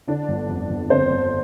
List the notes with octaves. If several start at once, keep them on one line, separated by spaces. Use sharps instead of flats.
D3 D4 D5
G1
F2
G1
D3 C4 C5
G1